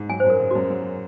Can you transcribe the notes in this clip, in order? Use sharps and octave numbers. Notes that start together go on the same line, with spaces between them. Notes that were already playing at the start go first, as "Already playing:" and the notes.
Already playing: G#2
F#3 G#5
F#2 C5
A#4
C#3
F#2 F#4
F#3